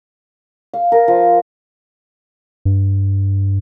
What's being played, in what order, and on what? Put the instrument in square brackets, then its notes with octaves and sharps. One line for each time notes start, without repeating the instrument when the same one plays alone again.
[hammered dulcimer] F5
A#4
F3
[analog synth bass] G2